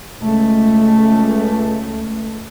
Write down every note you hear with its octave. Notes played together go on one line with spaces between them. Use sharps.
C#2 A3